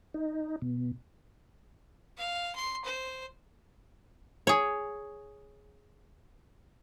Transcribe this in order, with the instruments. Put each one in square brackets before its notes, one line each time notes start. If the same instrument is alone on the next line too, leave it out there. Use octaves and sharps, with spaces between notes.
[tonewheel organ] D#4
B2
[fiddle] F5
C6
C5
[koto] G#4 C#5